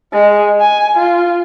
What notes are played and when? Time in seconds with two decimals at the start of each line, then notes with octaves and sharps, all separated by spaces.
0.12 G#3
0.60 G#5
0.97 F4